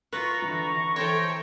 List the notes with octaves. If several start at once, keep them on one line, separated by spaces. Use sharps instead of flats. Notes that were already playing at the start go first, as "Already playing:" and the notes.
F4 B4 A#5 C#6
D3 E3
E3 A4 C5 C#5 G5